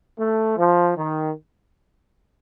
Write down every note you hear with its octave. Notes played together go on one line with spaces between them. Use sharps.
A3
F3
D#3